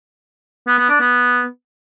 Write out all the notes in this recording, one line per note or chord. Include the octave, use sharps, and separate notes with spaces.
B3
B3
D4
B3